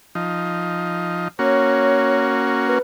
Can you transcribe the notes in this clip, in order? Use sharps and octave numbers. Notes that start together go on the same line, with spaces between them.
F3 D#4
A#3 C#4 F#4 C#5
B4